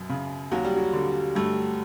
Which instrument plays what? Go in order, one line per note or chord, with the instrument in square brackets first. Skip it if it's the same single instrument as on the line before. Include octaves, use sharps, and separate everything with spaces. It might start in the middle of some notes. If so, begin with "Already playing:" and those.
Already playing: [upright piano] F#2 B2
C#3
[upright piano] D#2 [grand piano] F#3
[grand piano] G3
F#3
[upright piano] D3
[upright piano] G2 [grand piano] A3